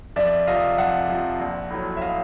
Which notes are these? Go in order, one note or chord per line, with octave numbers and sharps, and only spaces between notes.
F2 D5 E5
C3 F3 D#5 F5
F2 E5 F#5
C3 F3
A#1
A2 F#3
E5
D#5 F5